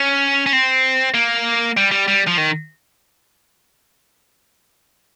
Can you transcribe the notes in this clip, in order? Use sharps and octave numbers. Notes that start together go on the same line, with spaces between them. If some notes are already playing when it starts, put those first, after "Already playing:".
Already playing: C#4
C#4
C4
A#3
G3
G3
G3
F3
D#3